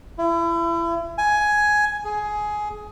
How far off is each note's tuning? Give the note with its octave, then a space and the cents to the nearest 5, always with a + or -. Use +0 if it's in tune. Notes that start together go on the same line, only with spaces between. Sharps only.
E4 +35
G#5 +10
G#4 +15